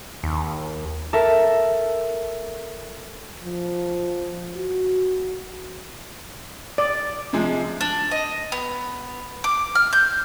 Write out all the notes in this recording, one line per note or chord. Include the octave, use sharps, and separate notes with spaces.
D#2
A4 A#4 E5
F3
F#4
D5
C3 F3 G#3
D4
D#5
B3
D6
F6
G6